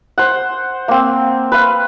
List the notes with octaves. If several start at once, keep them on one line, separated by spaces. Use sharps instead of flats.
C5 F#5
A#3 C4
B4 F5